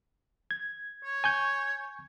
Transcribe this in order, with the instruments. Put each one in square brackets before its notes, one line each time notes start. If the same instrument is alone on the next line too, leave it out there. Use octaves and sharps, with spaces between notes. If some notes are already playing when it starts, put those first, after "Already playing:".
[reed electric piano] G#6
[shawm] C#5
[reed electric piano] G#5 C#6 G6